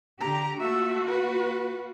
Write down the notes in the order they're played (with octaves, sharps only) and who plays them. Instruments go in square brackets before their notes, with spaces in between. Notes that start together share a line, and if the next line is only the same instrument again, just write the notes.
[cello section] D3 G4 [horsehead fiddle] A#5
[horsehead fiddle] A3 E5 [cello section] A#3 F4 F#4
[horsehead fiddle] B4